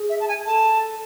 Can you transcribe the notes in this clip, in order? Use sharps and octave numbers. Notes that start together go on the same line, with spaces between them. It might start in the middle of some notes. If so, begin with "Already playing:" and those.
Already playing: G#4
E5
A5
G#5
A4 A5